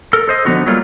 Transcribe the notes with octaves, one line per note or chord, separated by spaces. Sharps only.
A4 A#4
A4 C5 D#5
D3 F3 B3 D#4 F4 F#4
F#3 G3 A3 A#3 F4